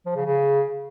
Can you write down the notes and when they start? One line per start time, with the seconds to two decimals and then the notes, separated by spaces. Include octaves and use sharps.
0.06 F3
0.16 C#3
0.26 C#3